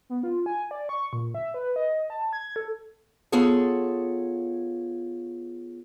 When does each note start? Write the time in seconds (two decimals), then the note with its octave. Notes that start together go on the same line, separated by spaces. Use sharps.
0.10 B3
0.23 F4
0.46 G#5
0.71 D5
0.89 C#6
1.13 A#2
1.35 E5
1.54 B4
1.76 D#5
2.10 A5
2.33 G#6
2.56 A4
3.32 B3 F4 G#4 A4 C#5